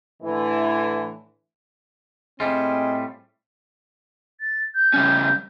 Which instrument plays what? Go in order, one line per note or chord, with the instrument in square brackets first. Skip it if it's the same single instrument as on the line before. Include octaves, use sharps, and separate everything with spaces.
[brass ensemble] A2 D3 E3
[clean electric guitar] A2 G3 F4 [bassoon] G#3 [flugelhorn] C4
[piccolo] A6
G6
[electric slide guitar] C#3 G3 C#4